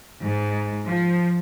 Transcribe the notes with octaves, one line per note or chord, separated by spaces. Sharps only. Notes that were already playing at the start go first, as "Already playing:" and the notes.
G#2
F3